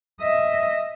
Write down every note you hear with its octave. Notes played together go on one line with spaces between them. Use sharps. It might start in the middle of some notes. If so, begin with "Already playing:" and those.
D#5 E5